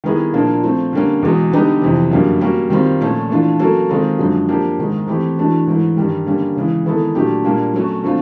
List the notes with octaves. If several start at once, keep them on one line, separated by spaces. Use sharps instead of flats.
D#3 G3 B3 E4 G#4
A#2 F3 A#3 D4
F3 A3 C4
D3 G3 A#3 C#4
E2 B2 G#3
D3 G3 B3 D#4 G4
F2 C3 E3
F#2 D3 G3 A#3
G3 A#3 C#4 F#4
D#3 G3 C4 F4
A#2 F3 A3 C#4
E3 A3 D4 F4
F#3 A#3 C#4 F#4 A4
D#3 G#3 C4 F4 A4
F#2 D3 F3 G#3
F3 A#3 D4 G4
G#2 D#3 G#3
E3 A3 C4 E4 G4
E3 A3 D4 F#4
G#2 E3 A3
G2 D#3 G3
D3 G3 A#3 C#4
C#3 E3 G#3
D#3 G#3 B3 E4 A4
A#2 F#3 A3 D4 G4
A#2 G3 A#3 D4
F#3 A3 C#4 F#4
D3 F3 A3 C4 F4